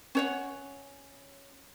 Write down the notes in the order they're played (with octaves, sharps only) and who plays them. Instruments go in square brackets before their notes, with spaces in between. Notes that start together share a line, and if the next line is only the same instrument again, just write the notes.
[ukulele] C#4 C#5 F#5